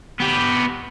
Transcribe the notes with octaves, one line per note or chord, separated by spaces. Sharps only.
B3 G4